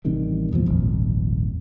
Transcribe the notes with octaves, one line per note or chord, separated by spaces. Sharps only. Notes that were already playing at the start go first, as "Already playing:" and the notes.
A1 C3 D#3 G3
B1 E2 A#2 F3
D#1 G#1 F2